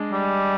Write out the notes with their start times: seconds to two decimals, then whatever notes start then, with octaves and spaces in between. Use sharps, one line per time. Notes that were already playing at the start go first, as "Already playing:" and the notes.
Already playing: G#3 D4
0.12 G3